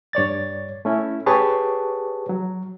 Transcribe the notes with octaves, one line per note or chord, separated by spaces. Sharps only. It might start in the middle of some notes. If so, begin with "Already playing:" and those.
G2 C#5 D5 A6
A3 C#4 E4
G4 G#4 B4 C#5 A5 C#6
F#3